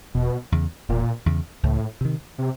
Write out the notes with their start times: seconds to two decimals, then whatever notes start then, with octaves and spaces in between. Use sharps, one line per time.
0.15 E1 B2
0.52 E2 C#3
0.89 E1 A#2
1.26 E2 C#3
1.63 C#2 A2
2.01 C3 D#3
2.38 C3